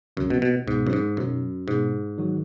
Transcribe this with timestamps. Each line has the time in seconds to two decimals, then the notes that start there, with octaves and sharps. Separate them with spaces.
0.17 C#2 F#2 C#3 F#3
0.30 B2
0.42 B2
0.67 C#2 G#2 B2 B3
0.87 F#2
0.93 G#2
1.17 F#2 B2 F#3 D#4 F#4
1.68 G#2 B2 B3 G#4
2.18 D#3 F#3 D#4 F#4